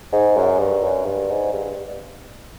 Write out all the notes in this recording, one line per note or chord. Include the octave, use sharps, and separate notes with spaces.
G#2
F#2
G2
F#2
G2
G#2
G2
G2